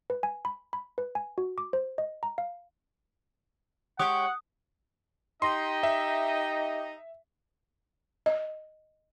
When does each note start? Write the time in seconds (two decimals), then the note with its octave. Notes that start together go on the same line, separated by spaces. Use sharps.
0.10 B4
0.23 G#5
0.45 B5
0.73 B5
0.98 B4
1.15 G#5
1.38 F#4
1.58 D6
1.73 C5
1.98 D#5
2.23 A#5
2.38 F5
3.99 G#3 G4 C#5 F#5 D#6
5.42 D#4 G4 D#5 C6
5.83 E5
8.26 D#5